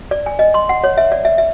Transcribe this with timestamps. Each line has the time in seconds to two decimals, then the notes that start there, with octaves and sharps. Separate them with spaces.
0.11 D5
0.26 G#5
0.39 D#5
0.54 C6
0.69 F#5
0.84 C#5
0.98 E5
1.12 D5
1.25 E5
1.38 E5